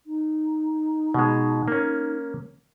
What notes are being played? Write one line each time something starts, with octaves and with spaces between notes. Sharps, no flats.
D#4
B2 G#3
A#3 C#4